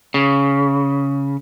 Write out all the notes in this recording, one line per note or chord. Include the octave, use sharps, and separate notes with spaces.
C#3